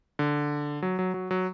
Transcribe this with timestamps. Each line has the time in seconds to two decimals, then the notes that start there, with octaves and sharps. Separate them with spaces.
0.19 D3
0.82 F#3
0.99 F#3
1.14 F#3
1.31 F#3